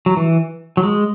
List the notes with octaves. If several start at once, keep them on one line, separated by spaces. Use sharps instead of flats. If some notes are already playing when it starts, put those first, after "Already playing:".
F#3
E3
F#3
G#3